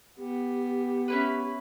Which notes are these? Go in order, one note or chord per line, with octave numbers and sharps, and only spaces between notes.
B3 G4
C#4 E4 B4